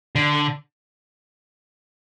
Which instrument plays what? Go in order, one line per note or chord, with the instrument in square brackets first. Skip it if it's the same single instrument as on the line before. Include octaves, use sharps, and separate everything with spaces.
[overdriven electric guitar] D3